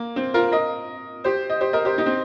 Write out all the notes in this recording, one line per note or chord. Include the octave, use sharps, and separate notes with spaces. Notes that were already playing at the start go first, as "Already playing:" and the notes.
Already playing: A#3
C4
F4 A#4
A#4 D#5
G4 C5
D#5
G4 C5
A#4 D#5
G4 C5
D#4 G4
C4